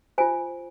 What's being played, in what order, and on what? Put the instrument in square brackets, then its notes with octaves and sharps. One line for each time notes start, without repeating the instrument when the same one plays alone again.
[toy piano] F4 C5 G#5